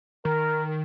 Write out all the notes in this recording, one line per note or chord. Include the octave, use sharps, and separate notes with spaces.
D#3 A#4